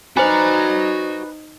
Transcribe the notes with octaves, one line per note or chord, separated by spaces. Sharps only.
D#4 F#4 B4 C5 D5 G#5 A#5